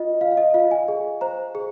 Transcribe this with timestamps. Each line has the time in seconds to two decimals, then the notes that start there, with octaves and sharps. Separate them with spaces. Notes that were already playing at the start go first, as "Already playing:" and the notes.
Already playing: F4 D#5
0.21 F4 F5
0.31 F5
0.37 D#5
0.54 F4 F5
0.71 G#5
0.88 G#4
1.21 C5 A#5
1.55 G#4